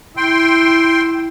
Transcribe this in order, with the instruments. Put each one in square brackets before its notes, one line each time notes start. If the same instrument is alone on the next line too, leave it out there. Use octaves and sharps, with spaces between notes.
[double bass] E4 [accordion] G5 C6